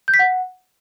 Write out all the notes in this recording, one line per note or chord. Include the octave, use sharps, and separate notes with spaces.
G6
B6
F#5